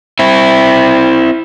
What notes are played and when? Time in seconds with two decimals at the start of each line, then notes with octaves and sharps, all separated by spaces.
0.19 C4 E4